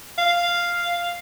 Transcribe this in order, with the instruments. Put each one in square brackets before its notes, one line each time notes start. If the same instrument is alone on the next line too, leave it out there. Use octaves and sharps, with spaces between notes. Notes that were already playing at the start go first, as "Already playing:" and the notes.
[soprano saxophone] F5